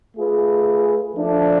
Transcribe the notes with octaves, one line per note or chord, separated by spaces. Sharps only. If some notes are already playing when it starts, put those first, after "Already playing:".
A3 F4 G#4 B4
F3 A3 D4